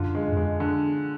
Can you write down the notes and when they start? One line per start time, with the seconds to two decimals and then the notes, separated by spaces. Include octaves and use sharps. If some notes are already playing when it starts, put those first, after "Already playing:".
Already playing: F#2 D3 F4
0.15 G#3
0.32 F#2
0.37 F2 G#3
0.60 D3